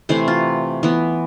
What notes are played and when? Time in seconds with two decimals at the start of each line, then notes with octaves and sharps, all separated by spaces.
0.09 C3 E3 A3 C5
0.28 F4
0.83 E3 B3